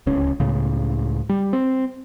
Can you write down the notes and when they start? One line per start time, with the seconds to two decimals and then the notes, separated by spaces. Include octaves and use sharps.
0.06 D1 C#2 C#4
0.40 C#2 A2 C#3
1.29 G3
1.53 C4